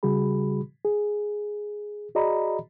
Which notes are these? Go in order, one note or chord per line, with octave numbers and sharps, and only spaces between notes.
C#3 G3 F#4 G#4 B5
G#4
F#4 G#4 D5 D#5 A#5 B5